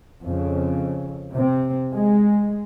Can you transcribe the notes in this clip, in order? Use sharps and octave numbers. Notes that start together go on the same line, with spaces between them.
F2 C#3
C3 C4
G#3